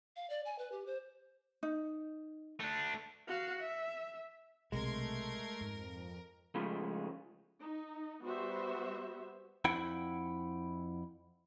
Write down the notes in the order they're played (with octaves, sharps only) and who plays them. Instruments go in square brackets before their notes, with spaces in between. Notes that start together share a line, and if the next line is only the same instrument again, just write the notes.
[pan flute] F5
D5
G#5
B4
G4
C5
[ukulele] D#4
[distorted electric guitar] A3 D4
[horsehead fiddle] F#4 F5
E5
[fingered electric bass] B1 C3 [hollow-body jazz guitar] G#3 [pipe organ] A3 C6 G#6 [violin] A#4
[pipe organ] F2 [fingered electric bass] G#2
[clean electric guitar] C#3 F3 G#3 A3
[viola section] D#4
G3 B3 F#4 C5 E5
[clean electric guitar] F2 E4 F#5 G5